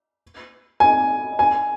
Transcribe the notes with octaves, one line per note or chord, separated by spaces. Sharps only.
G#5
G#5